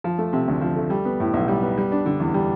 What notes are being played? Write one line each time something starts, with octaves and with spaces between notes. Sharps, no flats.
F3
A3
C3
D2
F3
A3
G3
B3
A2
B1
G3
B3
G3
D4
D3
E2
G3